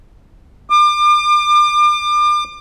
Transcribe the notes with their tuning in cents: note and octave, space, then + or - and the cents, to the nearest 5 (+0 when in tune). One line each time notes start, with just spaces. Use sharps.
D6 +35